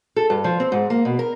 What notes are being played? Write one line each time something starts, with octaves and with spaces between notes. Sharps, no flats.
A4
G2
F3
C4
G#2
A#3
B2
A#4